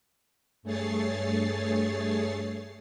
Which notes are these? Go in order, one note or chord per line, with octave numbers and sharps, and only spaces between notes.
G2 A3 G#4 C#5 A6 C7